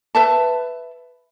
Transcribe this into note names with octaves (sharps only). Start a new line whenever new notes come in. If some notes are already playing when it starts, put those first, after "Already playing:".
B4 E5 A5